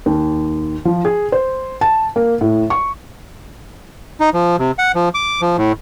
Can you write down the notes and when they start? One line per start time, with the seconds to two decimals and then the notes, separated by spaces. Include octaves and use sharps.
0.06 D#2
0.85 F3
1.05 G#4
1.32 C5
1.81 A5
2.16 A#3
2.41 A2
2.70 C#6
4.20 D#4
4.34 F3
4.59 C3
4.79 F#5
4.95 F3
5.14 D6
5.42 F3
5.57 A2